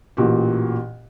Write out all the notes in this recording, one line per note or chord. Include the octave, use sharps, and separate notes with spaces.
A1 A#2 F#4 G4